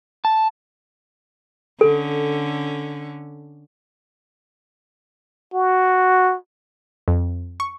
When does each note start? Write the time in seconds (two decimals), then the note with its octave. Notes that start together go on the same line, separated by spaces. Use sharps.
0.25 A5
1.81 D3 C#4 A4
5.54 F#4
7.08 F2
7.60 C#6